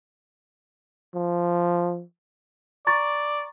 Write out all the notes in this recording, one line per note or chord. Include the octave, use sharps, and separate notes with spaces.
F3
D5 A#5 C#6 A6